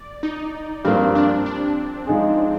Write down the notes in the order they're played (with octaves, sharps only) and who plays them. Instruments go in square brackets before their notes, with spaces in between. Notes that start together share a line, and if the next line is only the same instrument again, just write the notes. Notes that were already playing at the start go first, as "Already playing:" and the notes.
Already playing: [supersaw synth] D5
D#4
[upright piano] G2 F3 A#3 [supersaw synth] C4
[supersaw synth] D4
D4
[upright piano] F3 G#3 D#4 G#4